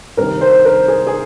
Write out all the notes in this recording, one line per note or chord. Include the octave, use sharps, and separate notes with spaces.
C2 C3 D#3 A#4
C5
A#4
G#4
G#4